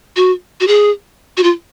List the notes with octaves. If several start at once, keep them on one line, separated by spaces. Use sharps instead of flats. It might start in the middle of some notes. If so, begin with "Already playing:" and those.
F#4
F#4
G#4
F#4
F4